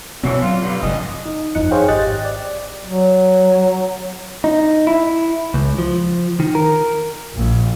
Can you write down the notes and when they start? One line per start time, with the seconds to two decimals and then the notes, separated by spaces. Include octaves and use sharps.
0.23 B2 D3 E3 F#3 C4
0.42 F#3 F4
0.62 G2 D3
0.82 F1 G2 D3 D#5
1.25 D#4
1.55 G1 F2 F3 D#4 F#6 C#7
1.71 G#4 C5 C#5 F5 G5
1.88 G#1 G4 D#5 G5 F#6 A6
2.25 D5
2.85 F#3
4.44 D#4
4.87 E4
5.54 C#2
5.79 F3
6.40 D#3
6.55 A#4
7.34 A#1